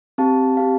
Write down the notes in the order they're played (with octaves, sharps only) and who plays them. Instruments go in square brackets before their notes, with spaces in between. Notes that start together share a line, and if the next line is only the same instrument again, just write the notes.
[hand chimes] C4 G4 F5 A5
C4 G4 F5 A5